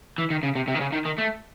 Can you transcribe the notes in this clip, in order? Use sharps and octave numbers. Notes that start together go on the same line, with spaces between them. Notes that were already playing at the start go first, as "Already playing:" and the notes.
E3
D#3
C#3
C3
C3
D#3
C#3
D#3
D#3
A3